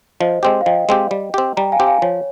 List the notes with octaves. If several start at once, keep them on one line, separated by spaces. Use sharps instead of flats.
F3 C5 D#5
G#3 C4 G4
F5
F3 D#5 G5
G#3 C4 G4
G3
C4 G4
G3 G5 A#5
F5 G#5
C4 G4
F5 G#5
F3 C#5